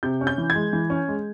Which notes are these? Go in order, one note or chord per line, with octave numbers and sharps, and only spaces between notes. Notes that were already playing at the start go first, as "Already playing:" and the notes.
C3 G6
C#4
G6
E3
G#6
G#3
E3
C#4
G#3